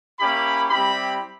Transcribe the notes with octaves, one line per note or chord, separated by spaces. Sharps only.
A#3 C#4 E4 G4 B5
G3 C4 E4 G4 B5